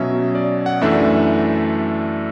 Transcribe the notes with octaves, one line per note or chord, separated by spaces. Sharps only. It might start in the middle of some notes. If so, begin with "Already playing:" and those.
Already playing: B2 F#3 C#4 E5
D5
F#5
F#2 E3 A3 D4 E5